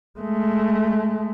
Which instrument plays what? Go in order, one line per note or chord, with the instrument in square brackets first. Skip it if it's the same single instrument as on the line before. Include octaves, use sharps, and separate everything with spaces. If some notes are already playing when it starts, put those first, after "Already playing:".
[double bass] G#3 A3